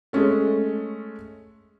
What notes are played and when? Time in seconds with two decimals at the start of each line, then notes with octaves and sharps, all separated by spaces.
0.13 G#3 A3 C#4 A4